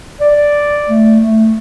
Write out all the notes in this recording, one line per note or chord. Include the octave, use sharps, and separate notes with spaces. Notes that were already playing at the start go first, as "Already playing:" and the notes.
D5
A3
A3